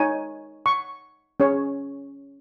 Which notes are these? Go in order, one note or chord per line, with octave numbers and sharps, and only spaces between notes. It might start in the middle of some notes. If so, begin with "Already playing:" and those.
Already playing: D#4 C#5 G#5
C#6
C#4 G#4 C#5